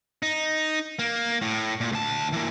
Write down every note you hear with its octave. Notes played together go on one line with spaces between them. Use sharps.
D#4
A#3
A2
A#2
D2 A5
E3 A#3